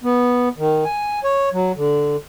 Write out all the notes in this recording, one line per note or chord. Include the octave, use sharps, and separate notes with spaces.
B3
D#3
G#5
C#5
F#3
D3